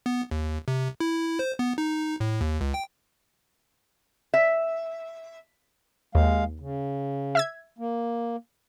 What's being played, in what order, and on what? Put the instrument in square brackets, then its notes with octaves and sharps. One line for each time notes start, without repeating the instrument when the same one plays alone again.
[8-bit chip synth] B3
D#2
C3
E4
C5
B3
D#4
A2
D#2
C#2
G5
[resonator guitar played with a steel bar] E5
[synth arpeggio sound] D#2 [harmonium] G#3 F5
[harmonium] C#3
[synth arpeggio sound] E5 E6 G#6
[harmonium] A#3